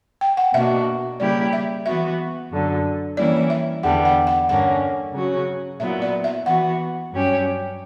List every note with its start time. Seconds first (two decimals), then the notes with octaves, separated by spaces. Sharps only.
0.21 G5
0.37 F#5
0.54 B2 A#3 D4 F#4 E5
1.20 C#3 G3 A#3 E4 G4 D5
1.53 E5
1.86 E3 B3 F#4 E5
2.51 F#2 D3 F#3
3.17 E3 G3 A#3 C#4 E4 D5
3.50 E5
3.83 E2 D3 G3 B3 F#5
4.05 F#5
4.27 F#5
4.49 G2 D3 A#3 C#4 F#5
5.14 C#3 F#3 C#4 F#4
5.80 A#2 F#3 B3 E4 E5
6.02 D5
6.24 E5
6.46 E3 B3 F#4 F#5
7.12 G2 F#3 C#4 G4